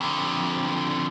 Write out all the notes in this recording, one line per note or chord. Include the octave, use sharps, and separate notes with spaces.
F2 D3